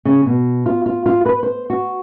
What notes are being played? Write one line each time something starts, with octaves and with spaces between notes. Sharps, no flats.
C#3
B2
F4
F4
F4
B4
C5
F#4